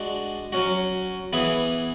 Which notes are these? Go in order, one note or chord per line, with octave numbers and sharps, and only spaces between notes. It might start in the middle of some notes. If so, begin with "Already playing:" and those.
Already playing: G#3 D4 F#4
F#3 C#4 F#4
E3 B3 E4 G#4